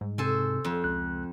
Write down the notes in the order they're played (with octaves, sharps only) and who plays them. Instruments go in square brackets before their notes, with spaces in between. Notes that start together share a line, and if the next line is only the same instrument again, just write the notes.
[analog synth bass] G#2 [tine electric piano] G3
[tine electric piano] C3 C4 [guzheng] A4 C5 G#5
[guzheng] F2
[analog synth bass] C#2 [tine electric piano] F#6